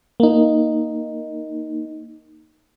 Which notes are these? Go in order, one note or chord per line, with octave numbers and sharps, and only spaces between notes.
A#3 D#4